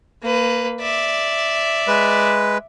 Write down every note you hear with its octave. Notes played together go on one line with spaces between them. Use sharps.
A#3 B4
D5 E5
G#3 B4